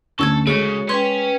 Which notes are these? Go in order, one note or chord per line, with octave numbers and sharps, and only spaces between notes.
D2 C#4 A4 C#6 E6 G#6
C#3 G#3 F#4 A4 C#5
C#4 B4 G5 C6 G#6